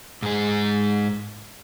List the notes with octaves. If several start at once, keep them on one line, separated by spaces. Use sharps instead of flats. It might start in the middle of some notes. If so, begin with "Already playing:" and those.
G#2 G#4